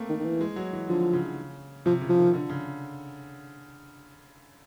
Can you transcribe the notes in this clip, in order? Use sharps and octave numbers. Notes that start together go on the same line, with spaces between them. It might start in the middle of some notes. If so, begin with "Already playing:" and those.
Already playing: A3 A#3 C4
D#3
D#3
E3
G#3
F#3
E3
D3 F3
C#3
C3 F3
C#3
F3
D#3
D3
C#3